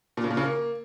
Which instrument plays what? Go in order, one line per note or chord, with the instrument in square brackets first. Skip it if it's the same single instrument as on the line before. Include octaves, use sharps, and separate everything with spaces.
[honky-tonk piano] A#2
C#3
A#2
C#3
A#3